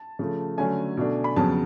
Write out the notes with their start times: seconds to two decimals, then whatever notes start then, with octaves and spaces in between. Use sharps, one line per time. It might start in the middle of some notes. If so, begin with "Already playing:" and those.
Already playing: A5
0.19 C#3 F3 A3
0.58 D3 F#3 A3 C#4 G#5
0.97 B2 A3 D4
1.24 B5
1.36 F2 C#3 F#3 B3 A5